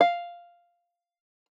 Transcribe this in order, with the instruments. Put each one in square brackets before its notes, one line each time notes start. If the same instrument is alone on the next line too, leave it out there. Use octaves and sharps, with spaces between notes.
[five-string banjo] F5